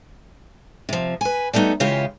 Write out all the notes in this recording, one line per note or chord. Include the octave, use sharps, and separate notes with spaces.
C3 F3
B4 G#5
G3 A3 B3 D#4 F#4
C#3 E3 G#3 F4 G4